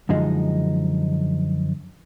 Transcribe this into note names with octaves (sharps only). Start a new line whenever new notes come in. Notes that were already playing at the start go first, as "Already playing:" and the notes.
F#2 D3 F3 G#3 D#4